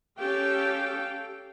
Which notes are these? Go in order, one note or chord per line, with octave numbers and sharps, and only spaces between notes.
C#4 G4 A4 F5 G5